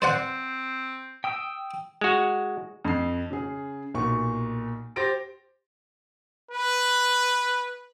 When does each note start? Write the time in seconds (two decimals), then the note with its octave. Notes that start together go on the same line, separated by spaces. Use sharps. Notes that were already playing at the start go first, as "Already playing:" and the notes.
0.02 C4 C5 D5 F#5
1.24 G5 D#6 E6
2.01 G#3 F#4
2.85 F2 C7
3.31 C#3 G#4
3.94 B1 A#2 C#6
4.96 G4 C5 A6 A#6 D7
6.51 B4